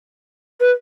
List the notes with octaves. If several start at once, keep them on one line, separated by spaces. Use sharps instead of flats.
B4